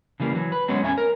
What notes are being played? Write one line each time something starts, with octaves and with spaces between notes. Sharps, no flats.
C#3 E3 G3 A#3
E3 F#3
B4
F#3 G#3 B3 C#4 C#5
E2 C#4 E5 G#5
A#4